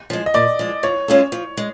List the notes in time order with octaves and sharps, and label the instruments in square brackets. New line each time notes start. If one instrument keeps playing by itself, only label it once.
[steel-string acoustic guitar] F3 G#3
[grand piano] D#5
[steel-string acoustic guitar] A#2 [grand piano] D5
[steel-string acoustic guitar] F3 G#3
[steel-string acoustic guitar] F3 [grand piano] C#5
[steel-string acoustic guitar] G#3 C#4 F4 A4
F3
G#3